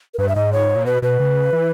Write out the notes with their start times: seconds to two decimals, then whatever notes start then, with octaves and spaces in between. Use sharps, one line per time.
0.14 A#4
0.18 G2 B4
0.29 E5
0.36 G#2 D#5
0.53 C#5
0.76 A#2
0.86 B2 B4
1.02 B2 B4
1.20 C#3
1.53 E3